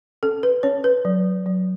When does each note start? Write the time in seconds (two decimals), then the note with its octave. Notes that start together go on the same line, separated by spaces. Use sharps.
0.23 C#4 A4
0.43 B4
0.63 C#4 C#5
0.84 B4
1.05 F#3
1.46 F#3